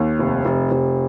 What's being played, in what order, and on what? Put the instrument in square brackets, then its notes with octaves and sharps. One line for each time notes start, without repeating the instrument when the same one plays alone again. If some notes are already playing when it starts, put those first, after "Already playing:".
Already playing: [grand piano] D#2
F1
F1
F1